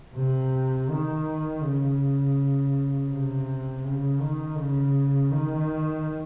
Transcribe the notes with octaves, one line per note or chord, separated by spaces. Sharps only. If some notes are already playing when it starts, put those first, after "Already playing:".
C3
D#3
C#3
C3
C#3
D#3
C#3
D#3